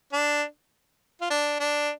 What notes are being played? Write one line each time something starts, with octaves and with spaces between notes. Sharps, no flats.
D4
F4
D4
D4